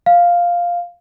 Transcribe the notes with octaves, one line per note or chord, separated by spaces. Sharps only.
F5